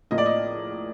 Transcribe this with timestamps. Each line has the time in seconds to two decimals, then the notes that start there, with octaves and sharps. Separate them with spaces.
0.11 A2 F3 A#3 D#5
0.18 D5
0.26 D#5